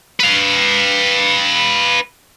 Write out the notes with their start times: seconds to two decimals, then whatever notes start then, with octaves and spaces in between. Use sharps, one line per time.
0.20 B4 F5